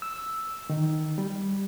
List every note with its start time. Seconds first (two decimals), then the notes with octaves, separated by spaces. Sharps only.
0.02 E6
0.70 D#3
1.18 G3